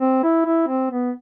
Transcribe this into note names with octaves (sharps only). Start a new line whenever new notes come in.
C4
E4
E4
C4
B3